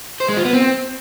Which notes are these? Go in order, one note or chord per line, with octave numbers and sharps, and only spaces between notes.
C5
G#3
F4
B3
C4